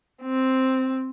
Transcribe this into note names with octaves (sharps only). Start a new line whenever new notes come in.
C4